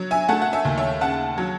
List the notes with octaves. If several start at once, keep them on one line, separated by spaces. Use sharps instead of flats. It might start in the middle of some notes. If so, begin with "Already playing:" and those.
Already playing: F#3
E5 G#5
A3 F#5 A5
F#5
E5 G#5
D#2
C#5 E5
C#3 F#5 A5
F#3